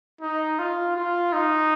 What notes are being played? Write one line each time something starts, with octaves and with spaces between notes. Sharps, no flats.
D#4
F4
F4
D#4